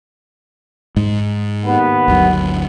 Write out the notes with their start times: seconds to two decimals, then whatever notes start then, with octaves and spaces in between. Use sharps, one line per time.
0.96 G#2 G#3
1.64 D#2 B3
2.08 G1 D2 F#3